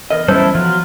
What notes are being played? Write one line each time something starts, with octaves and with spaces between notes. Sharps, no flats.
E2 A#4 D#5
F#3 G3 C#4 E4 A4 C5
F3 F#3 F4